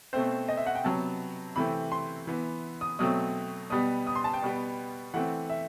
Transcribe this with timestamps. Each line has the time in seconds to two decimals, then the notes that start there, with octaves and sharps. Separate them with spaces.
0.13 B2 A3 C4 C5
0.49 D#5
0.57 E5
0.66 F#5
0.75 G5
0.84 C3 F#3 B3 A5
1.56 C3 E3 A3 C4 B5
1.92 C6
2.27 E3 B3
2.81 D#6
2.99 B2 F#3 A3 C4 D#6
3.70 B2 G3 B3 D#6
4.07 D#6
4.16 C6
4.24 A5
4.34 G5
4.42 B2 G3 B3
5.14 E3 A3 C4 F#5
5.50 E5